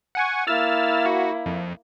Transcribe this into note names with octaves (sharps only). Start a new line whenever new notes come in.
F#5 G#5 C#6
A#3 E4 E6 F6 A6
F#4
F2